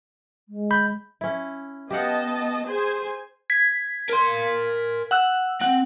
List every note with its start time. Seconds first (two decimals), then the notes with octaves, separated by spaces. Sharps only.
0.48 G#3
0.71 B5 G6
1.21 C#4 E4
1.91 B3 G4 D#5 F5 F#5 A5
2.66 G#4 C5 G#5
3.50 G#6 B6
4.09 A#4 C6
5.11 F#5 E6 F#6
5.61 C4 F#5